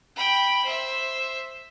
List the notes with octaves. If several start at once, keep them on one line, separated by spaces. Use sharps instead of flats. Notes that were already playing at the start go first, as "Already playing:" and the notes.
G5 B5
C5 E5